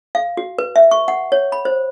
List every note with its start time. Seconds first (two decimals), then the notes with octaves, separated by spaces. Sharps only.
0.15 F5
0.37 F#4
0.58 B4
0.76 E5
0.91 C#6
1.08 F#5
1.32 C#5
1.52 B5
1.65 C5